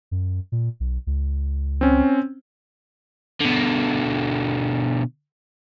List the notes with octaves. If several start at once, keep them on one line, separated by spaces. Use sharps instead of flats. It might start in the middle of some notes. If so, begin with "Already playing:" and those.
F#2
A#2
B1
C#2
C4 C#4
B2 D3